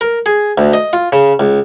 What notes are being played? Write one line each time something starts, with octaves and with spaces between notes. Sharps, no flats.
A#4
G#4
D2
D#5
F4
C#3
C#2